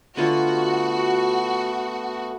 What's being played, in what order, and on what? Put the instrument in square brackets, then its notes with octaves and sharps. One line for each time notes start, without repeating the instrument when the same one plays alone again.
[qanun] D3 F4 [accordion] A3 B3 [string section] F#4